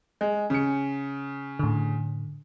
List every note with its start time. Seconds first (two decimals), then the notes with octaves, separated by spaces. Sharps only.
0.21 G#3
0.50 C#3 C#7
1.59 A2 D3